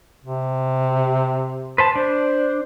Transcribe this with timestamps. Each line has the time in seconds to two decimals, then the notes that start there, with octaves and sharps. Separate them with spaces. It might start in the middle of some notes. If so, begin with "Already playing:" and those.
0.24 C3
1.78 B4 C5 A5
1.96 D4 C5